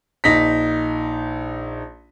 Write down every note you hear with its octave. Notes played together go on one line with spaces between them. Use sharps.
A#1 D#4 A#6 B6